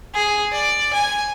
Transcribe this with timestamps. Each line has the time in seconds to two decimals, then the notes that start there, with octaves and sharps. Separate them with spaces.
0.14 G#4
0.52 D5
0.93 G#5